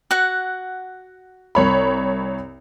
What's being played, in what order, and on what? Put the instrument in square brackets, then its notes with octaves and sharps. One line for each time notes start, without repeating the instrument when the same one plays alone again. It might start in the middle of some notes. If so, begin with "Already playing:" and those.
[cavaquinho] F#4 F#5
[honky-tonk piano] C2 C#5 B5